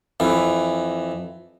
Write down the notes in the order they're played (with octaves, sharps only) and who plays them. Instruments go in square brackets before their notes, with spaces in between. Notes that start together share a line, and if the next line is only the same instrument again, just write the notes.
[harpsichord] F2 E3